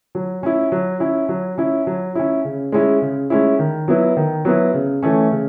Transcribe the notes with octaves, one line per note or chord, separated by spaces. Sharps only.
F#3
C#4 E4
F#3
C#4 E4
F#3
C#4 E4
F#3
C#4 E4
C#3
G#3 C#4 E4
C#3
G#3 C#4 E4
D#3
F#3 B3 E4
D#3
F#3 B3 E4
C#3
E3 A3 C#4
C#3